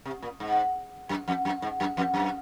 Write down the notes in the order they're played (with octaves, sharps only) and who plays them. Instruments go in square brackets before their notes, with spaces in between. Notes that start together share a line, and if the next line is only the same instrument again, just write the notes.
[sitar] C3
A#2
G#2
F#2
F2
F#2
G#2
F#2
F2
F#2